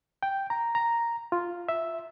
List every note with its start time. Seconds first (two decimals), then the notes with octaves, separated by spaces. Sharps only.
0.23 G5
0.50 A#5
0.75 A#5
1.32 F4
1.69 E5